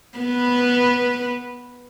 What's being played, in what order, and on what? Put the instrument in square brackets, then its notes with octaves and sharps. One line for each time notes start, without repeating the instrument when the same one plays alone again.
[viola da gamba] B3 B4